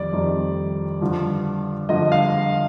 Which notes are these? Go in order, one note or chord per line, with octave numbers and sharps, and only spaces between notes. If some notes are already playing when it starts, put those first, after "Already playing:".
Already playing: F2 D#3 G3 D5
F2 D#3 G3
G2 D3 F3
G2 D3 F3 D#5
F5